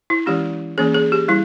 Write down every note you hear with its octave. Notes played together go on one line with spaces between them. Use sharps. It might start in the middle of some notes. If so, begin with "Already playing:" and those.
E4
E3 G#3 C#4 G4
E3 A#3 C#4 G#4
G#4
G4
G3 E4